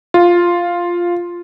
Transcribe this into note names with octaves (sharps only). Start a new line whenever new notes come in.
F4